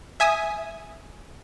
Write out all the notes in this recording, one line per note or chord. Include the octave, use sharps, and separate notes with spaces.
E5 G#5 D#6